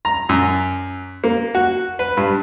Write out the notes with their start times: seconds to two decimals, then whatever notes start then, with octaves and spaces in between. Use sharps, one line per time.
0.05 A#5
0.29 F#2
1.24 A#3
1.55 F#4
1.99 B4
2.17 G2